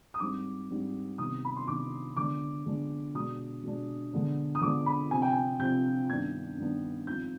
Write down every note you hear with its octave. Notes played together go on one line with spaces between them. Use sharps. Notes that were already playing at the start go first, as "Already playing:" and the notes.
D#6
G#2 G3 C4 D6
G#2 G3 C4
C3 D#3 B3 D#6
B5
C6
C3 D#3 B3 D6
D3 G#3 B3 D4 D6
D3 G#3 B3 D4
B2 G#3 D4 D#6
B2 G#3 D4
D3 G#3 B3 D4
D#6
D3 G#3 B3 D4 D6
B5
C3 F3 C4 G#5
G5
G#5
C3 F3 C4 G6
G2 D#3 B3 D4 G#6
G2 D#3 B3 D4
G#2 F3 C4 G6